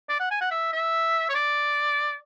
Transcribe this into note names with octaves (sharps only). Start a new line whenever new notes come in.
D5
F#5
G#5
F#5
E5
E5
C#5
D5